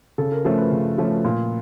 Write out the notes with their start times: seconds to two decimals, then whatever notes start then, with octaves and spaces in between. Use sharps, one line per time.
0.18 C#3 A4
0.32 A#4
0.45 F3 A3 C#4 C5
0.58 B4
0.71 C#3
0.98 F3 A3 C#4
1.24 A#2